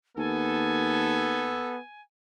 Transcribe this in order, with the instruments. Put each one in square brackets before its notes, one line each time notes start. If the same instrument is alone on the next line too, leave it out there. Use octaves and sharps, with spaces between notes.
[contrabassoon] D#2 [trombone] B3 [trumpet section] A4 [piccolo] G#5